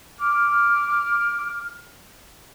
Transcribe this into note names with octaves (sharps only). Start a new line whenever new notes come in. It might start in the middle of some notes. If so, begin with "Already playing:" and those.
D6 F6